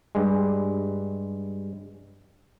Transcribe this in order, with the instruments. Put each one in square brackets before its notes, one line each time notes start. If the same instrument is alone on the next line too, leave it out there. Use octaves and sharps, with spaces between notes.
[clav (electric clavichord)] G2 G3 G#3